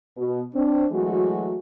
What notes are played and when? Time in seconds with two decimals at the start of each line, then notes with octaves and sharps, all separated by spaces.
0.16 B2
0.54 C4 D4
0.92 E3 F#3 G#3 A3 F#4